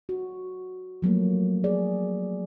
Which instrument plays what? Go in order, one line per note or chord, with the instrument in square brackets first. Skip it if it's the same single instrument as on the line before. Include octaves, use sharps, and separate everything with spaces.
[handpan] F#4
F3 F#3 A3 A#3
G#4 D5